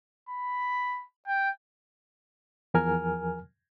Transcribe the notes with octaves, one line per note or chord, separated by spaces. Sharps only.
B5
G5
E2 F3 A#4 G#5 F6